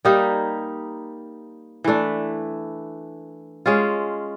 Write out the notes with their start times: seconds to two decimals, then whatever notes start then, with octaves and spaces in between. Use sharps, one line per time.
0.05 G3 A#3 D#4 G4
1.84 E3 A3 D4
3.66 G#3 C#4 F4